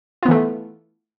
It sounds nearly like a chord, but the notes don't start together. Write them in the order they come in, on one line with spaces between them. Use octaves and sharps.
F4 B3 E3 A3